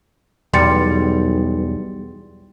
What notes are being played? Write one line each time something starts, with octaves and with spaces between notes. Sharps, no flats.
B1 E2 G3 C6 A6 C#7